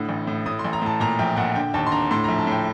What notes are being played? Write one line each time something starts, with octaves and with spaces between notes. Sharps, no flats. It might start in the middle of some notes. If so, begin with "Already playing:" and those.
Already playing: A2 D3 D#6
A1
A2
A2 D#6
C6
A1
A#5
A2 A5
A#2 A#5
A#1 G5
A#2 F#5
D3 G5
D#2 A5
C6
D3 A#5
A2 C6
A#1 A#5
A5
A2 G5